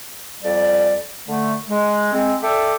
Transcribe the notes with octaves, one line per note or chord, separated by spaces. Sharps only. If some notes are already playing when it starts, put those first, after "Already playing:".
F2 G3 D5
D3 A3
G#3
G#3 C4
A4 D5 E5 G5 D6